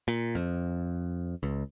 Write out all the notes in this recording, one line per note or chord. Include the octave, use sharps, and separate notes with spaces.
A#2
F2
C#2